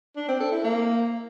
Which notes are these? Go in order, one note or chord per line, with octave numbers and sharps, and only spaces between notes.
D4
C4
A4
E4
A#3